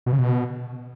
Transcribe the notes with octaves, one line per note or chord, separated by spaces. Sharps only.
B2
C#3
B2